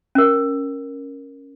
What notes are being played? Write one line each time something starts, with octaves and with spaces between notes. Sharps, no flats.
C#4 A#4